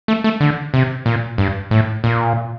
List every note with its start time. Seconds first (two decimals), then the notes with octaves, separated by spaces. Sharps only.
0.08 A3
0.24 A3
0.41 D3
0.74 C3
1.06 A#2
1.38 G2
1.71 A2
2.04 A#2